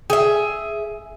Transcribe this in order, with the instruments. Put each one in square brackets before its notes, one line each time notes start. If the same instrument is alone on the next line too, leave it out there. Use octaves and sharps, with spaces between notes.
[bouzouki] G#4 E5